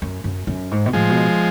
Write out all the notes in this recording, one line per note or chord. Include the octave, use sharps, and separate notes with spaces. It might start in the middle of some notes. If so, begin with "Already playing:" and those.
F#2
F#2
F#2
G#2
B2
A2 F3 G#3
B2